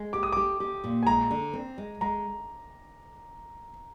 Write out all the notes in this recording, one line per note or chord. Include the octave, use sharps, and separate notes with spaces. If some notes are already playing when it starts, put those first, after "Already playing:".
Already playing: G#3
G4 D6
D#6
G4 D6
G4
A#2
G#5
G#3 A#5
D3
C4
G#3
G#3 A#5